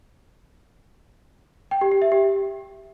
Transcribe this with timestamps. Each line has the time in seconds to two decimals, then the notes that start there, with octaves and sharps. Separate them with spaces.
1.71 G5
1.81 G4
1.91 G4
2.02 E5
2.12 G4